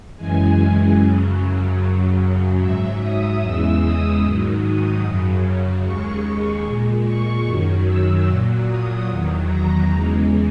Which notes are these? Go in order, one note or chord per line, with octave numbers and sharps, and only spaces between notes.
F#2 C#3 E3 G#3 G#5
F#2 C#3 F#3
F#2 C#3 F#3
G#2 F#3 E5
D#6
E2 C#3 E3 G#3 E6
D#6
G#2 D#3 F#3
D#6
F#2 C#3 F#3
D#2 C#3 G#3 C#6
A#2 G#3
C#6
F#2 D#3 F#3
E6
A#2 F#3
D#6
E2 D#3 F#3
A#5
E2 C#3 E3 G#3